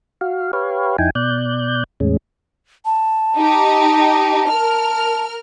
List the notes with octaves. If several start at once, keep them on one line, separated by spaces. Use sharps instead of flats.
F#4 F5
G4 B4 C#5 F5
F2 D#4 E4 G5 G#5
B2 D5 F#6 G6
E2 A2 G#3 C#4
A5
D#4 G4
A#4 F6